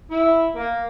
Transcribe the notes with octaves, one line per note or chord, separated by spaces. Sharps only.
E4
A#3